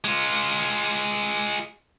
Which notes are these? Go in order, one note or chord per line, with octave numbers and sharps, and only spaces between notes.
G#3 F4